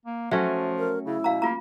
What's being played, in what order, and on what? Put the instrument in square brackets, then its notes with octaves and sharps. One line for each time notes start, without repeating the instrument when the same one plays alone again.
[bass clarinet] A#3
[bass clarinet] F3 [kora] F#3 A3 C#4 [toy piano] E5
[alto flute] A#4
[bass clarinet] C#3 [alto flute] E4
[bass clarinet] B2 [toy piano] F5 A#5
[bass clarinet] A#3 [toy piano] F4 A#5